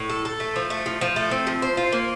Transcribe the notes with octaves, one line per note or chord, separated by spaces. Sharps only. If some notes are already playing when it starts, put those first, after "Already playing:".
Already playing: A2
A4
A4
A3
F3
A3
F3
F3
A3
C4
F3
C5
F4
A#3